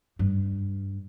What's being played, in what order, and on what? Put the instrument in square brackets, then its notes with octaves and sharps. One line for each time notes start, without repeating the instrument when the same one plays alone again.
[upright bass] G2